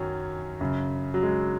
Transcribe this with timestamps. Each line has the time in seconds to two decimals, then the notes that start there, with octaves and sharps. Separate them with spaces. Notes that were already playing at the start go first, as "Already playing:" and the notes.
Already playing: F#2 D#3 F#3 C#4
0.61 F#2 C#3
1.14 F#3
1.23 G#3